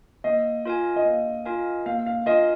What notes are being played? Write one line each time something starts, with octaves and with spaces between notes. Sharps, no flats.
A#3 D#5
F4 A#4 F5 G#5
D#5
A#3 F5
F4 A#4 F5 G#5
A#3 F5
F5
F4 A#4 D#5 F5 G#5